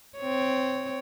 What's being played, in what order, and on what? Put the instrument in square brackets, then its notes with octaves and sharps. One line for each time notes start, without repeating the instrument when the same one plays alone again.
[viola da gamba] C4 C#5